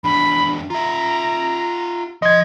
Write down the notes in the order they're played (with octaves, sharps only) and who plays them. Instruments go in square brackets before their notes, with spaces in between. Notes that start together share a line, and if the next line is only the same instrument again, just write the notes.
[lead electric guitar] E2 D4 [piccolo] B5
[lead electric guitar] F4 E5 [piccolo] A#5
[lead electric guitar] F3 C6 [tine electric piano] D#5 G#6